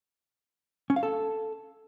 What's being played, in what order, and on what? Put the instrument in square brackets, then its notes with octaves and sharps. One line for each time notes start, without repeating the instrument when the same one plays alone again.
[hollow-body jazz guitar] C#4
F5
A4